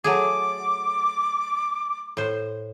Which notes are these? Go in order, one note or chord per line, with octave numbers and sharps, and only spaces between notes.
F#3 A3 G#4 D6
A2 C5